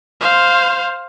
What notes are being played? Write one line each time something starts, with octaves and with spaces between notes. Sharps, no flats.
C5 F5